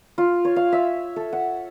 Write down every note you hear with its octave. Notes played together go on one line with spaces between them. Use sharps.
F4
C#5
F5
E5
A4
F#5